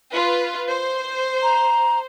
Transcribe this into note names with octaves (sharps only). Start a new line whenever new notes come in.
F4 B4
C5
A#5